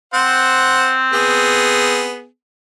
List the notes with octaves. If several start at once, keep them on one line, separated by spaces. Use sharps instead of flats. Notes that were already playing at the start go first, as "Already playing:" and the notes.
C4 C5 F#5
B3 G#4